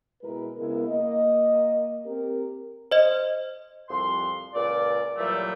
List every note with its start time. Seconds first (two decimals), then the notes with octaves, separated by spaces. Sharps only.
0.22 B2 G#3 E4 A#4 B4
0.58 C#3 G#3 B3 E4 A#4
0.88 A#3 D#5
2.05 C4 G4 A#4
2.91 C5 D#5
3.89 C2 F2 C6
4.54 C#2 A#2 D5
5.17 A#2 E3 F#3 G3 A3